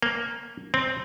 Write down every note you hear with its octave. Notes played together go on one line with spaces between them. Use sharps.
A#3
C4